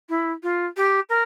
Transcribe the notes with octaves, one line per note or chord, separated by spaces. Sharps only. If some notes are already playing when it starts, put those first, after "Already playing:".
E4
F4
G4
A#4